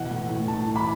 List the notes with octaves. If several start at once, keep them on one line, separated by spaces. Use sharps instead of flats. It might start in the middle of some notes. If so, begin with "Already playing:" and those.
Already playing: B2 E3 F#5
A2
A2
A2 A5
E3
B5